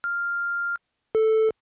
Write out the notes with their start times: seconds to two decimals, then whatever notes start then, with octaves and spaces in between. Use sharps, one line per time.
0.04 F6
1.15 A4